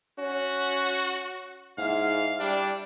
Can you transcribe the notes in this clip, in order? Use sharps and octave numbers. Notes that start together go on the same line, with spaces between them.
C#4 F#4
G#2 E4 F5 F#5
G3 D4